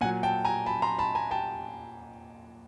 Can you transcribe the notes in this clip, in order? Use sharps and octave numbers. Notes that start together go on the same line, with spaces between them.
A#2 F#3 F#5 G#5
G5 A5
G#5 A#5
A5 B5
A#5 C6
A5 B5
G#5 A#5
G5 A5